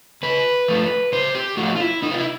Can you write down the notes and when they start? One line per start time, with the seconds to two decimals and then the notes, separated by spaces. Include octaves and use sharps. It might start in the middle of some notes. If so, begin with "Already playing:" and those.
0.23 C#3 B4
0.68 F3 A3
1.12 C#3 C5
1.35 G4
1.57 F3 A3 F#4
1.75 F4
1.80 E4
2.02 C3 D#4
2.11 F4
2.18 E4